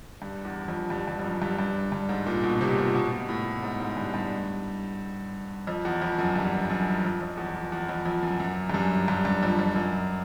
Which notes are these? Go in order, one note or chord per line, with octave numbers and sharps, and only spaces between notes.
G2
E2
F2
G2
G2
F2
F#2
G2
G2
G2
G#2
A#2
B2
C3
A#2
B2
B2
A2
G#2
G#2
G2
G2
F2
E2
F2
F#2
G2
F#2
F2
F2
E2
F2
E2
F2
F2
F#2
F#2
G2
F#2
G2
G2
F2
F2
F#2